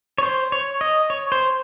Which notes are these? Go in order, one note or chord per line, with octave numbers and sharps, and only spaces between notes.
C#5
C5
C#5
D#5
C#5
C5